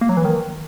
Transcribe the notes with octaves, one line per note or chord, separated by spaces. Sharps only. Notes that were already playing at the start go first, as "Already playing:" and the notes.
A#3
F#3
E3
D#3